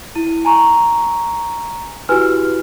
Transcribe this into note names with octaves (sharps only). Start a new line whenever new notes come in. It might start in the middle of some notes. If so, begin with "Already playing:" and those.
E4 D#7
G#5 A#5 C#6
E4 F#4 G4 B4 G#5 F6